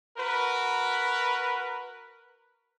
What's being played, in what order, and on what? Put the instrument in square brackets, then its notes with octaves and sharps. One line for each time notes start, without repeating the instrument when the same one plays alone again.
[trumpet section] F#4 A#4 B4